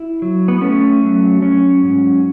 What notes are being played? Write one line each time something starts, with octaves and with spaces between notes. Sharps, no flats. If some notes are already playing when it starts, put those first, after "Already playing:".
Already playing: E4
F#3
B3
A3 C#4
F#3
F#3 C#4
G#2